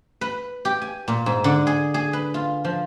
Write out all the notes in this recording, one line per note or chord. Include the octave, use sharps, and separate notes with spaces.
B4
G4
G#5
A#2
G#2
D3
G#4
G#4
B4
F4
F3